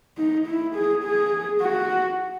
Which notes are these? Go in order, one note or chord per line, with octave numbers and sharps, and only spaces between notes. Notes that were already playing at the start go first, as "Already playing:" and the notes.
D#4
E4
G#4
G#4
F#4